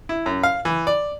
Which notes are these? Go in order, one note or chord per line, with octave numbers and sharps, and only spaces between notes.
E4
F#2
F5
E3
D5